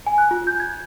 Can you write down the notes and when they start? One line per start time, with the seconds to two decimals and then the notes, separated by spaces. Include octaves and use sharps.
0.07 G#5
0.18 F#6
0.31 F4
0.47 G6
0.60 G#6